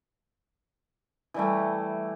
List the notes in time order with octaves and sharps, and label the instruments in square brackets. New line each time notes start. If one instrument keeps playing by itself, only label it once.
[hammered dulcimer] E3 G3 A3